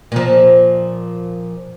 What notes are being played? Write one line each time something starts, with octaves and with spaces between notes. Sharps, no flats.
A#2 F3